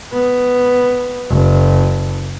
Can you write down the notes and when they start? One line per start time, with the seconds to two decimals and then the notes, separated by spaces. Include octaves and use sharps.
0.13 B3
1.30 F#1